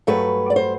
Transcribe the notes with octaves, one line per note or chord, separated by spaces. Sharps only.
G2 F#3 A3 B4
D5
C5